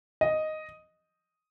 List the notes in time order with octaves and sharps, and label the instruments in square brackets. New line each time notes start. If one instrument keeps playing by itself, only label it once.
[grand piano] D#5